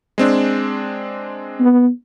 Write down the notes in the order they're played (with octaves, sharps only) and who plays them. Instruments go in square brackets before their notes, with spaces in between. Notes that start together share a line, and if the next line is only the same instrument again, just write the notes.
[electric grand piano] G#3 C4 D4
[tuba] B3